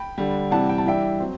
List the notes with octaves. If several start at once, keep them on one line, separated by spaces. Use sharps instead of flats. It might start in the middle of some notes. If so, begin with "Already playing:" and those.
Already playing: G5 B5
D3 G3 D4
C3 E3 G3 F#5 A5
G5
A5
E3 G3 D4 E5 G5
F#3 C4